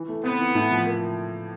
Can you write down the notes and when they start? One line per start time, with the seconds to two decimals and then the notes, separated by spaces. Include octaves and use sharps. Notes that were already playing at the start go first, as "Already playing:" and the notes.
Already playing: E3
0.08 A3
0.24 B3 C4
0.40 E3
0.55 A2
0.71 F3
0.87 A#3